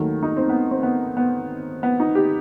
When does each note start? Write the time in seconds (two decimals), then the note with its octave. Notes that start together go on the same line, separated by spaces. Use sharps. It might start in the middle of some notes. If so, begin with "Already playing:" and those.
Already playing: D#2 D#3 F#3 A3
0.23 D#4
0.37 C4
0.50 B3
0.71 C4
0.83 B3
1.17 B3
1.83 B3
2.00 D#4
2.15 G4